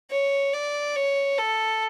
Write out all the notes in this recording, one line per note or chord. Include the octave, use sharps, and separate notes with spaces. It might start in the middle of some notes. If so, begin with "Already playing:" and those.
C#5
D5
C#5
A4